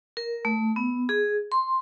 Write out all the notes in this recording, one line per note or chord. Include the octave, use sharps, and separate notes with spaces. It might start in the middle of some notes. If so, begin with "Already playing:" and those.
A#4
A3
B3
G#4
C6